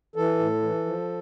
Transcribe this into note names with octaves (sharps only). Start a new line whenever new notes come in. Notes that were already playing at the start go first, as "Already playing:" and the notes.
E3 A4
A2
E3
F3